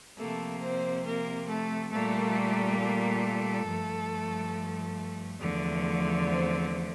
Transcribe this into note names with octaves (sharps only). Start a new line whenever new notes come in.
C3 F3 A3 A#3 A4
C4 C5
A#3 A#4
A3 A4
A#2 G3 A3 A#3 A4
A3 A4
G2 F3 A3
E2 D3 F3 A3
C4 C5